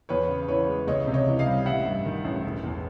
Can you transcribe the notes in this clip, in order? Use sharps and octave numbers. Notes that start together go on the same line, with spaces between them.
E2 B4 C#5
C#3
E3 B4 C#5
G#3
C#2 C#5 D#5
C3
C#5 D#5
E3
D#5 F5
G3
A1 E5 F#5
G2
D#3
A1
E1
E2